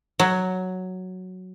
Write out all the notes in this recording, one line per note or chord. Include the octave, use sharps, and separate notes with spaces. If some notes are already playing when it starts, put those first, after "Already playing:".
F#3